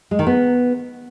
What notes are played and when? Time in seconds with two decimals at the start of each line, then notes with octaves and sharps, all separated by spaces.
0.11 G#3
0.19 D#3
0.27 B3